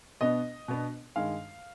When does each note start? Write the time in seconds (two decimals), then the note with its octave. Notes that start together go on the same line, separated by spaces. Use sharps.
0.21 B2 B3 D4 D#5
0.68 B2 B3 D4
1.16 G2 D#3 G#3 F5